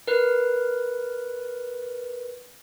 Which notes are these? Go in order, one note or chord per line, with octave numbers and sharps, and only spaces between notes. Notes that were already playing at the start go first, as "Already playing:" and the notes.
A#4 B4